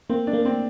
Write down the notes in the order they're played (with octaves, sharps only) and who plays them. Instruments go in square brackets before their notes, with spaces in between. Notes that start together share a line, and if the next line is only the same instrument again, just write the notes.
[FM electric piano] A#3 [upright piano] C4
[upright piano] D4
[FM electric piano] A#3
[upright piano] C4